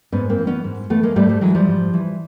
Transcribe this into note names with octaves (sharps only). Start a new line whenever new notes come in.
G#2 B3 C#4
A#3 C4
E3
B3 C#4
G#2
E3 A3 B3
G#3 A#3
G#2 G3 A3
G3 A3
E3 F#3 G#3
F3 G3
G#2
E3